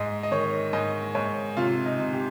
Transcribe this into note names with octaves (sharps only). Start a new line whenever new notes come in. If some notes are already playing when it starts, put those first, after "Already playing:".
Already playing: G#2 D#5
D#5
D#3 C#5
G#2 D#5
G#2 C#5
C3 F4
D#4
C3
G4